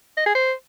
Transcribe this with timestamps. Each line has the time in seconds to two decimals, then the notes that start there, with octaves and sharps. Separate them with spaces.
0.17 D#5
0.26 G#4
0.35 C5